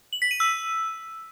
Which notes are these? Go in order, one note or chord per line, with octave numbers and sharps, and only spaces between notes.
F#7
B6
D#7
E6